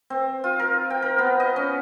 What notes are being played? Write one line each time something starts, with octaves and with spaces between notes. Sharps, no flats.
C4
F4
A#4
G5
A#4
B3
D#5
C#4